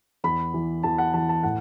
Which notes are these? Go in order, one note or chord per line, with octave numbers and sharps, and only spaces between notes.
E2 B5
E3
E2 A5
F#5
E3 A5
A5
A2 F#5